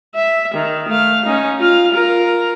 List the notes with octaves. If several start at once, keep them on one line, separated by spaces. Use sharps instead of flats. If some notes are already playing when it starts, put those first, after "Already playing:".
E5
D#3
A3 F5
C#4 D#4
F4 F5
F4 A#4